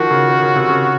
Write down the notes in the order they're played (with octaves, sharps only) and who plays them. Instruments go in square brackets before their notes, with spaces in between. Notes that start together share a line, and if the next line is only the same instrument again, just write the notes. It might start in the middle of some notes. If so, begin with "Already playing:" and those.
Already playing: [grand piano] D#3 F3 [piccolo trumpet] F#4
[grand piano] C#3
D#3
C#3
C3
C#3